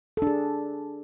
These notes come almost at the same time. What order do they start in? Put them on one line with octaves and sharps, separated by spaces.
A4 D4 G#4